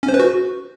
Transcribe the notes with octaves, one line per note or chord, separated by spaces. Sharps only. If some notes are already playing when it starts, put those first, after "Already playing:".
C#4
C5
B4
F#4